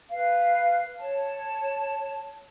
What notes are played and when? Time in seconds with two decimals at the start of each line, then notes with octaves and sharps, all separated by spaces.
0.11 B4 F5
0.99 C#5 A5